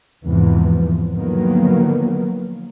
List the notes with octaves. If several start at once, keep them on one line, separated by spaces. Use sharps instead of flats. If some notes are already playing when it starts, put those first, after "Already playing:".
E2 G#2 C3 E3 F3
D3 D#3 F3 F#3 A#3 B3